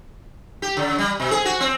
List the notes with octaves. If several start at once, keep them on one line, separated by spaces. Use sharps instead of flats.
G4
C#3
G3
B2
G#4
F#4
C4